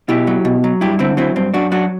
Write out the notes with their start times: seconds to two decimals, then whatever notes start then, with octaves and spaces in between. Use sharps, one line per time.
0.08 B2 E4 G4
0.27 F#3
0.45 B2
0.64 F#3
0.81 G2 E4 G4
0.99 D3 C4 E4
1.17 F#3 C4 E4
1.36 G2 C4
1.54 F#2 D4 F#4
1.71 F#3 D4 F#4